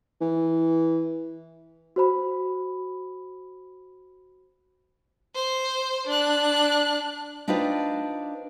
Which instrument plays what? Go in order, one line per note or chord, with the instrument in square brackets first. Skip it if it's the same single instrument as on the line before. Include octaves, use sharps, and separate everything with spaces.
[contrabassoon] E3
[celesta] F#4 C5 B5
[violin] C5
D4 F#6
[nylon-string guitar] D4 D#4 F4 B4 C5 G5